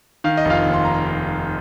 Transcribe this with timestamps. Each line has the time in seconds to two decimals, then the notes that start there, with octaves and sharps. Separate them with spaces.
0.24 D#3 F5
0.37 D#5
0.45 F1
0.50 F4 F5
0.66 D#2
0.73 C6
0.85 A#5